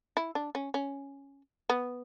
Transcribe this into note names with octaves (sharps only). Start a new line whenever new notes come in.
E4
D4
C#4
C#4
B3